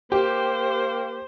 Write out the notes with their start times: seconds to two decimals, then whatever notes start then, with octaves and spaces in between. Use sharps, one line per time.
0.12 A#3 G4 C5